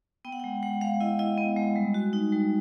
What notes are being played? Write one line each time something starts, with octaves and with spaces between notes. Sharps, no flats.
B3 G5
F#5
G#3 G5
G#3 F#5
G#3 F5
E4 D#5
E4 D#5
B3
G#3
G3
F#4
D#4
G3